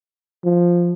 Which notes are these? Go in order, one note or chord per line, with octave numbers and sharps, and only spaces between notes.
F3